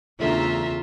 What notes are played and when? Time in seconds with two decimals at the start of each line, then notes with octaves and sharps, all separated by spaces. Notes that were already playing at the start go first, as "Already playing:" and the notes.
0.20 E2 C#3 E3 A3 D4 F4 E5 A#5